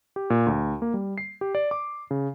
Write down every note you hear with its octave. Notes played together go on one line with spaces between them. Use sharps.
G4
A#2
D2
A#3
G3
C7
G4
D5
D6
C#3